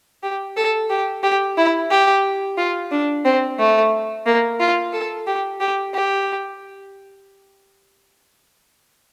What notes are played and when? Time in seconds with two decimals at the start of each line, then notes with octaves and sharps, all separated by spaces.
0.23 G4
0.56 A4
0.90 G4
1.23 G4
1.57 E4
1.91 G4
2.58 F4
2.92 D4
3.25 C4
3.59 A3
4.26 A#3
4.60 F4
4.93 A4
5.27 G4
5.60 G4
5.94 G4